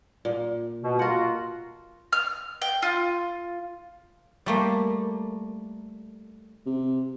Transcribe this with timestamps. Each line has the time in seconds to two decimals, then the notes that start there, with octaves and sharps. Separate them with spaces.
0.25 A#2
0.82 B2
0.99 F4 F#4 A#4 F#5
2.12 F6
2.62 G5
2.82 F4
4.46 G3 A3 A#3
6.66 C3